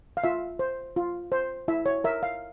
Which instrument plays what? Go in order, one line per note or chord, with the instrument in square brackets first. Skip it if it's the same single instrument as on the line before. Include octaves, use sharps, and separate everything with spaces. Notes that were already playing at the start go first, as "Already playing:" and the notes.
[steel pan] F5
F4 E5
C5
F4
C5
E4 E5
C#5
A#4 E5
F5